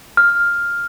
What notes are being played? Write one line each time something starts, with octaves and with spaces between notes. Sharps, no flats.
F6